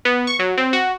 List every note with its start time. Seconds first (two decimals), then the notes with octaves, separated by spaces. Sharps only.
0.05 B3
0.27 C#6
0.39 F#3
0.58 C4
0.73 F#4